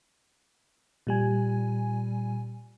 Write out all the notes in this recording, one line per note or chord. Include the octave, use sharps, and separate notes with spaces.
A#2 G3 G#5